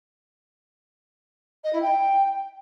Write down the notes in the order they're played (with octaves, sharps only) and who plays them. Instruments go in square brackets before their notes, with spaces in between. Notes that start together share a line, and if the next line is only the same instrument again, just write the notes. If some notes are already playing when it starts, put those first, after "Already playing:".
[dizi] D#5
E4
G5